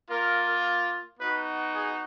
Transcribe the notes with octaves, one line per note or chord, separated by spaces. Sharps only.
A#3 F4 A#4
B3 D#4 F#4 B4
G#4